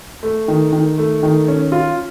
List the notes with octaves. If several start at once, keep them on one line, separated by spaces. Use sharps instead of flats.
A3
D#3
D#3
A3
D#3
C#4
F4